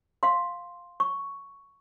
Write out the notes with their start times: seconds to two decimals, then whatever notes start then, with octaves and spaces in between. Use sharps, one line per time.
0.23 F5 C6
1.00 C#6